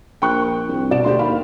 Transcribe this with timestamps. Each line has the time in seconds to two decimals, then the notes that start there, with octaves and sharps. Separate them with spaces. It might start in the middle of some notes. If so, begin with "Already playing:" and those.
0.22 A#1 G5 C#6 F#6
0.68 C2
0.91 B2 D5 E7
1.05 D2 G4 D5 C6
1.19 D#2 F5 B5